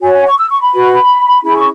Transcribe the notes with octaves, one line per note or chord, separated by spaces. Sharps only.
F#4 C#5 G#5
G#5
C#6
E6
C#6
B5
F#4 B4
C#4 E4 G#4 B5
C#6